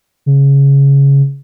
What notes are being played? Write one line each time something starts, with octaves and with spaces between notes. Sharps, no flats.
C#3